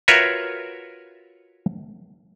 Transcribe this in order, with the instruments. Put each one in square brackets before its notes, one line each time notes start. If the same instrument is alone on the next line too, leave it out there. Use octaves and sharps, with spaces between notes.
[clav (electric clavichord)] F4 F#4 A#4 B4 C#5 E5